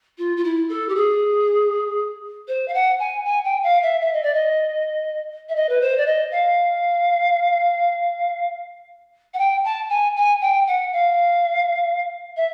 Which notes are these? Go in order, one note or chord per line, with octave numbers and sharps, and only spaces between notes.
F4
F4
E4
A4
G4
G#4
C5
F5
F#5
G#5
G#5
G5
F5
E5
E5
D#5
D5
D#5
E5
D#5
B4
C5
D5
D#5
F5
F#5
G5
A5
G#5
G#5
G5
F#5
F5
E5